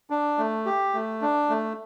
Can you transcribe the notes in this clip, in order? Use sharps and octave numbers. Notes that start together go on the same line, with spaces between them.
D4
A3
G4
A3
D4
A3